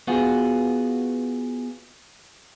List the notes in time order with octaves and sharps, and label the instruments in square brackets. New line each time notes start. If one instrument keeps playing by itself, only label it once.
[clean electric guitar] B3 F4 F#4 G#4